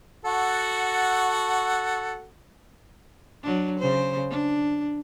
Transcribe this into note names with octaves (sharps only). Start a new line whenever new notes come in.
F#4 A4 F#5
F#3 D4
C#3 C5
D4